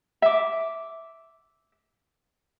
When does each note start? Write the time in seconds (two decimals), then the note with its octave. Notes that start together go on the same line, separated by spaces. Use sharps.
0.22 E5 D6